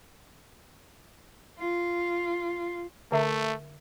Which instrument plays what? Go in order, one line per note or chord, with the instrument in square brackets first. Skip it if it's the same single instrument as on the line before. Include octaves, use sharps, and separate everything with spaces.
[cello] F4
[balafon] D3 E5 [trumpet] A3